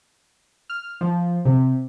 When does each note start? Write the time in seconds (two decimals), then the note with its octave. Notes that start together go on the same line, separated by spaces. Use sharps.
0.70 F6
1.01 F3
1.45 C3